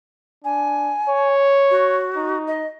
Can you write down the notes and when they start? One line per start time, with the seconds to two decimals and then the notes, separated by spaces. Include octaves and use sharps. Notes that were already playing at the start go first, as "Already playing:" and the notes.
0.45 D4 G#5
1.08 C#5
1.71 F#4
2.16 D#4
2.47 D#5